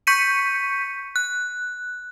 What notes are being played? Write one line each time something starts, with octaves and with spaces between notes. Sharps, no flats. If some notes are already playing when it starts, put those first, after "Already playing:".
C#6 G6 B6 C#7 D#7
F#6